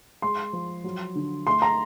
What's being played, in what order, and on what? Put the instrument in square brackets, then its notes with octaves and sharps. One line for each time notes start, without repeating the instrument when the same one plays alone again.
[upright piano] G#3 C6
F3
F#3
D3
A3 C6
A#5